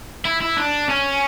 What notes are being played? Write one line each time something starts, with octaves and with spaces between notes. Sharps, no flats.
E4
E4
D4
C#4